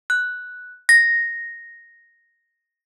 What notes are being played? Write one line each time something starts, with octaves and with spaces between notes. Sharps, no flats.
F#6
A#6